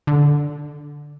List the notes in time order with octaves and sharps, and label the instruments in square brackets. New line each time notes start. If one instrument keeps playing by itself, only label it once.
[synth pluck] D3